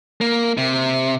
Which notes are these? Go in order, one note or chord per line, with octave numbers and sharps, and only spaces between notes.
A#3
C3